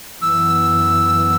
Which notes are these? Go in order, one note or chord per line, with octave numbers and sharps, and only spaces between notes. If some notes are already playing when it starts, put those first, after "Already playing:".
F#2 E3 B3 E6